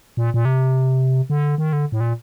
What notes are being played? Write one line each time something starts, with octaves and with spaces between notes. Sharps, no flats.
A#2
A#2
C3
D3
D#3
D3
A2
A#2